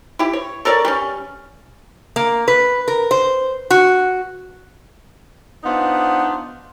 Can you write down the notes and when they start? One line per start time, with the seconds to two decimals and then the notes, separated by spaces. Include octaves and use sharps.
0.19 E4 G4
0.33 C#5
0.65 A4 A#4 C#5 D5
0.85 G3 C#4
2.16 A#3
2.48 B4
2.88 A#4
3.11 C5
3.70 F#4
5.64 B3 D4 D#4 F4 B4 C5